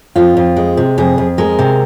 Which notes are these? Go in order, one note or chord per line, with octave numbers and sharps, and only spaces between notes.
F2 F4
F2
G#3
C3
F2 G#4
F2
G#3 A#4
C3